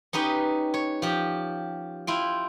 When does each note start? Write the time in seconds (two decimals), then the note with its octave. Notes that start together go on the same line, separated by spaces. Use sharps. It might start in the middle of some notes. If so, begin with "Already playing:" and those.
0.13 C#4 D#4 G4 B4
0.74 C#5
1.02 F3 G4
2.07 E4 F4 G5